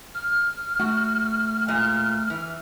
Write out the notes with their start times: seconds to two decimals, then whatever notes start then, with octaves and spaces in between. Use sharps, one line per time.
0.14 F6
0.80 A3 F#4
1.68 A#2 G#3
2.30 E3